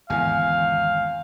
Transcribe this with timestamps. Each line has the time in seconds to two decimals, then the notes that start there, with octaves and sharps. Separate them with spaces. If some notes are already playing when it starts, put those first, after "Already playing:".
0.10 G#1 E2 D3 F5 G#5